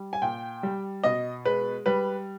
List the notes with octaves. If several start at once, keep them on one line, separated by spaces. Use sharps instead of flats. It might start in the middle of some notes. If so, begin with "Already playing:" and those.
Already playing: G3
G#5
A#2 G5
G3
B2 D#5
G#3 B4
G3 B4